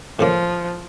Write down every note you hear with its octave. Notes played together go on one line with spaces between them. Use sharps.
A2 C#3 F3 A#3